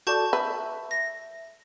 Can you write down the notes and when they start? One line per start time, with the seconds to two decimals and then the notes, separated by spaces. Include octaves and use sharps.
0.07 F#4 A4 D5 A5 C#6 G6
0.33 B4 E5
0.91 A#6